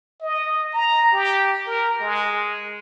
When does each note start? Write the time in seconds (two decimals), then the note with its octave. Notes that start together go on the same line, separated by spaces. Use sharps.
0.21 D#5
0.74 A#5
1.13 G4
1.67 A#4
2.00 G#3